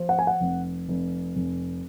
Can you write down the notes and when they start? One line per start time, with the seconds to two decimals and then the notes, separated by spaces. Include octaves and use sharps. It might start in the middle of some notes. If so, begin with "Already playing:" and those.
Already playing: F3
0.09 F#5
0.19 G#5
0.27 F#5
0.40 F1
0.88 F1
1.36 F1